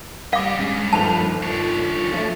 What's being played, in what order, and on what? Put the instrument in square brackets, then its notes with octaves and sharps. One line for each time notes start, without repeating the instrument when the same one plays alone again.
[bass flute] G3 [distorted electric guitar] G4 D#5 [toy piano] F5 D6
[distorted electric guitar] G2 [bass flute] G#3 [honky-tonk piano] C#4
[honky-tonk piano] G1 D#2 F7 [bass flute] F3 [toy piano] A5
[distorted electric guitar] D4 C#5 [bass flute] F4
[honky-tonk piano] F3 A3